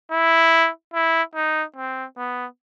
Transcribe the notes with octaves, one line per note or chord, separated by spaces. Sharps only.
E4
E4
D#4
C4
B3